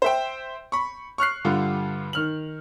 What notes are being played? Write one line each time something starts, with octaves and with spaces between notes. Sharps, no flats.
C5 E5 G5
B5 C#6
C#6 F6 F#6 C7
G2 D3 G3 F4
D#3 F6 F#7